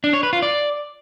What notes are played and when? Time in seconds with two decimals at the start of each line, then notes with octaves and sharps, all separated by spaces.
0.04 D4
0.13 C#5
0.23 B4
0.33 F4
0.42 D5